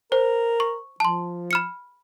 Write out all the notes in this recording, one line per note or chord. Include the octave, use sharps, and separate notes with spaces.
A#4 C5
C#6
F3 A5 C6
B5 F6 C#7